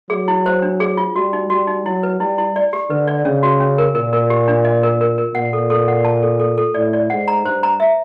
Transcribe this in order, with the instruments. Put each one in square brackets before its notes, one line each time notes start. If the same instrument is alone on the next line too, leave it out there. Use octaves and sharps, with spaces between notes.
[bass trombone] F#3 [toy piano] G#4
[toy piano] E4
C5
D4
G#4
F4
[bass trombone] G3 [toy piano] F#4
[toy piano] D#4
[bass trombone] G3 [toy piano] F#4
[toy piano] D#4
[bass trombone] F#3 [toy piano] E4
[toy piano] B4
[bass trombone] G3 [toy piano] E4
[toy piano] E4
D5
G4
[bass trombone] D3 [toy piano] B4
[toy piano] D5
[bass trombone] C#3 [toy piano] C#4
[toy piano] F#4
C#4
A#4
[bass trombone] A#2 [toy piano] A#4
[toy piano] A#4
G4
D4
D#5
A#4
A#4
A#4
[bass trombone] A#2 [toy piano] F#5
[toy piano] A4
A4
F#5
A5
A4
A4
A4
[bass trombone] A2 [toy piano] D5
[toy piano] D5
[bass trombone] G#2 [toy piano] F#5
[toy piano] A#5
[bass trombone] G2 [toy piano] C5
[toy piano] A#5
E5